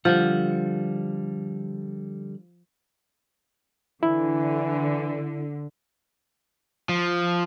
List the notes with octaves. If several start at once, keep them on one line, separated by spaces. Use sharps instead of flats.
D3 F3 G3 F#5
D3 E3 E4
F3